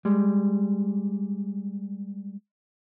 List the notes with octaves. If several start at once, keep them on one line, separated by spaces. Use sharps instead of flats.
G3 G#3